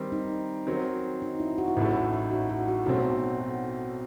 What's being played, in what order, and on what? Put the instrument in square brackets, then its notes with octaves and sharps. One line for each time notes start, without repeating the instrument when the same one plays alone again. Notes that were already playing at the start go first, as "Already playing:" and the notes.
Already playing: [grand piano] D#3 G3 C4
[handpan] D#4
[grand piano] D#3 F#3 C4
[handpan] D#4
E4
F#4
E4
[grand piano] A1 A2 F#3 A3 [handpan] F#4
[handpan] D#4
F#4
F#4
F#4
[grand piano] B1 B2 F#3 A3 C4 [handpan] F#4
[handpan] F#4
F#4